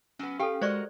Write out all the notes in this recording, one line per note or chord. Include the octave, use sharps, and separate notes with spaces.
F#3 B3 C#4
G4 A4 F5 G5
G#3 F#4 A#4 C5 D5 D#5 C#6